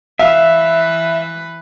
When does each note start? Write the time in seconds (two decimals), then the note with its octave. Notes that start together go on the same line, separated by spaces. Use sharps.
0.19 E3 B4 E5 F5